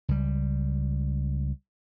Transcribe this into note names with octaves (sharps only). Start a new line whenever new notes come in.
C#2 G3